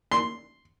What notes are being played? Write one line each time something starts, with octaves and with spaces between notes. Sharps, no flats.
C6